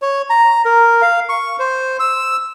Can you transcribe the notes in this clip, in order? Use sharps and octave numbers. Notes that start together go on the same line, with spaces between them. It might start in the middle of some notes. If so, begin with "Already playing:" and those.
C#5
A#5
A#4
F5
C#6
C5
E6